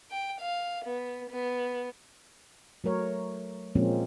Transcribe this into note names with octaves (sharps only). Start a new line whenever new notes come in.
G5
F5
B3
B3
F#3 A3 A#4 C#5
A#2 F3 G#3 A#3 C4 C#4